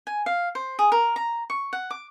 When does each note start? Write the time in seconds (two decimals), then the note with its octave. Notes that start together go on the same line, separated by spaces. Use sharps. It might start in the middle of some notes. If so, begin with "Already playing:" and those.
0.07 G#5
0.26 F5
0.55 C5
0.79 G#4
0.92 A#4
1.16 A#5
1.50 C#6
1.73 F#5
1.91 D6